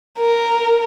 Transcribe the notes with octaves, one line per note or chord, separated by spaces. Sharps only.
A#4